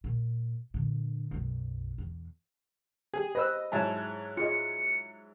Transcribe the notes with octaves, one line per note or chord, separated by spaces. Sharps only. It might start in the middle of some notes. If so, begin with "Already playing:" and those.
A#2
A#2 D3
B1 F#2
E2
G4 G#4
B4 C5 D#5 E6
G#2 F#3 E4 G#5 A5
F4 G#4 D#5 C#7